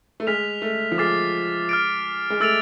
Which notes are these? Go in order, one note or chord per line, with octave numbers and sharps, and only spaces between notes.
A3
G#3 F6 B6 F7
A3
F3
G#3 D6 F6 A6 C7
F6 A6 D7
G#3
A3 E6 A6 D7 F7